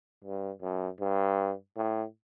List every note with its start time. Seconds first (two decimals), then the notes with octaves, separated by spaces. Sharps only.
0.24 G2
0.62 F#2
1.00 G2
1.77 A2